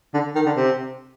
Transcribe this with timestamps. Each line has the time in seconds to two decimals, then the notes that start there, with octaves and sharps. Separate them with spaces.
0.14 D3
0.35 D#3
0.46 D3
0.57 C3